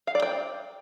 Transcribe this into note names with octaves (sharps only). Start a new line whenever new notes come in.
F5
D5
G5